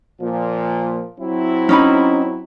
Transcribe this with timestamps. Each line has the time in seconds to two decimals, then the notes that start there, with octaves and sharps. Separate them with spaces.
0.21 A#2 F3
1.20 F#3 C4 E4
1.69 C#4 D#4 B5